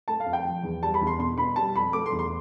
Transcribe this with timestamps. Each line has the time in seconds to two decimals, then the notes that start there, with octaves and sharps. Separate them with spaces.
0.08 A3 A5
0.20 F5
0.26 F2
0.33 G5
0.45 F3
0.63 E2
0.83 G3 A5
0.94 B5
1.01 E2
1.07 C6
1.19 B2 C6
1.38 B2 B5
1.56 G3 A5
1.76 F2 B5
1.93 A3 D6
2.06 C6
2.12 E2
2.19 C6